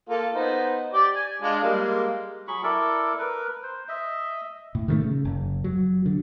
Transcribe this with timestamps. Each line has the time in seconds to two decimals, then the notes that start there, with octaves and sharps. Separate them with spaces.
0.09 A#3 F4 A4
0.35 B3 D#4 C5
0.93 G4 D5
1.15 G#5
1.42 G#3 D4 F4
1.63 G3 G#3 A#3
2.48 F#3 G#4 B5 C#6
2.63 E4 A4 A#4 D5
3.19 A#4 B4
3.63 C5
3.89 D#5 E5
4.75 A2
4.88 D#3 G3 A3
5.04 C#3
5.25 F#1
5.64 F#3
6.06 D3